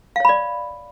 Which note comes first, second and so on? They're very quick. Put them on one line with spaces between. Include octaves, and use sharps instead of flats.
F5 C#5 B5 D5